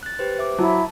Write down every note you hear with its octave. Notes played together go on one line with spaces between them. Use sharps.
F#6 A6
G4 B4 C5
C5 E5 D6
F#3 E4 A5